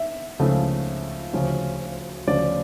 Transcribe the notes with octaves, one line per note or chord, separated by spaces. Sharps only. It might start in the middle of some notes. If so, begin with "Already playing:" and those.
Already playing: E5
C#2 C#3 F3 A3
D2 C#3 F3 C#4
D2 C#3 F3 C#4 D5